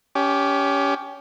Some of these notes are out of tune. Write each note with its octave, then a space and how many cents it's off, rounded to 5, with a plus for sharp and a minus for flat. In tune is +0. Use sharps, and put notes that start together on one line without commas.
C#4 +25 G4 +0